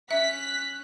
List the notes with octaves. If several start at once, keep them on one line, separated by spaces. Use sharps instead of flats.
C#4 E5 F#6 B6